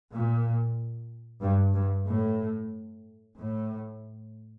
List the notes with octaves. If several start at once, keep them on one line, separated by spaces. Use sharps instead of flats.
A#2
G2
G2
A2
A2